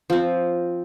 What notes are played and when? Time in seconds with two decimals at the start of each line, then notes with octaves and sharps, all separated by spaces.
0.10 F3 C4